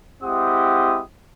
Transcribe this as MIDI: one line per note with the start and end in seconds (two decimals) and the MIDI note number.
0.23 1.01 56
0.23 1.01 60
0.23 1.01 64
0.23 1.01 67
0.23 1.01 78
0.23 1.01 87